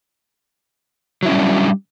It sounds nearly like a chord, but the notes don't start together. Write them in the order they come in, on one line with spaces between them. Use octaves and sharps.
F#3 E4 C#4 G3 D4